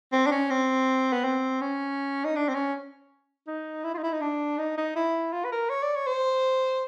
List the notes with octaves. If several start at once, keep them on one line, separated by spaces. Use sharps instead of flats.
C4
D4
C#4
C4
B3
C4
C#4
D#4
D4
C4
C#4
D#4
E4
F4
D#4
E4
D#4
D4
D#4
D#4
E4
F4
B4
A#4
C#5
D5
C#5
C5